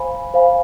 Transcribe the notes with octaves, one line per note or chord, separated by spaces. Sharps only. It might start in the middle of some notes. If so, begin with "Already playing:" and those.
Already playing: C5 F5 G#5 B5
C5 F5 G#5 B5